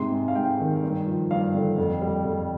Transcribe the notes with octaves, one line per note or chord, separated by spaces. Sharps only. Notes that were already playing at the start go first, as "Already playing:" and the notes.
Already playing: G#2 C3 C6
G#3
F5
G#2 G5
D#3
G2
F3
G2 F5
D3
F2
G3
F2